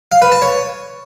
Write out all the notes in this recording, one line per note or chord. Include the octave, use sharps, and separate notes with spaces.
F5
B4
A5
C#5